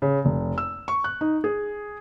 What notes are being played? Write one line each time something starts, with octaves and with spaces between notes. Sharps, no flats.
C#3
F1
E6
C#6
F#6
D#4
G#4